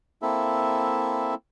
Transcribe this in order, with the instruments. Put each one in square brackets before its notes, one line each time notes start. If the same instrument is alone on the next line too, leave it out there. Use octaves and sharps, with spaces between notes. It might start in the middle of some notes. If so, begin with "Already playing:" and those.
[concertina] A#3 C4 E4 A4 E5